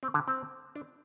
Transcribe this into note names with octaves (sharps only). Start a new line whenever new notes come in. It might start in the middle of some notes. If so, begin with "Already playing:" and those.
C4
D3
C4
D4